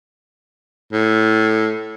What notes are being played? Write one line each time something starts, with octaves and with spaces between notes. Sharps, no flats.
A2